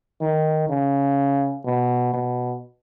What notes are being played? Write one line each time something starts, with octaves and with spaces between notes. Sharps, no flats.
D#3
C#3
B2
B2